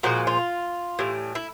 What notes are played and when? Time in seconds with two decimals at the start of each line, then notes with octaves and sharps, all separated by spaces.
0.03 A#2 F3 G#3 F#4
0.27 F4
0.99 A2 E3 G3
1.35 E4